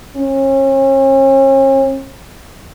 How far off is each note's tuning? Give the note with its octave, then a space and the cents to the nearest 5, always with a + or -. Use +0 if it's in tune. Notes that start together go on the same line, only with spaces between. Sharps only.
C#4 -40